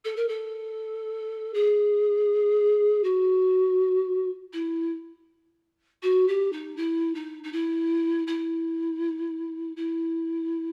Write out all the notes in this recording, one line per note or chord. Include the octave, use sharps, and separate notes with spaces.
A4
A#4
A4
G#4
F#4
E4
F#4
G4
D#4
E4
D#4
D#4
E4
E4
E4